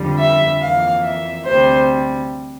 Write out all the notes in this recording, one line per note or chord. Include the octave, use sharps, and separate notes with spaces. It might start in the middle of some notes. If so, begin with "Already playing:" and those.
Already playing: F2 D3 G3
E5
F2 E3 A#3 F5
E5
D2 C3 G3 C5